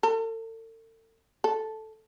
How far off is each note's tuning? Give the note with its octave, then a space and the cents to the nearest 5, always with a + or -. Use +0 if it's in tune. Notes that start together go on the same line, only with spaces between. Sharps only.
A4 +40
A4 -5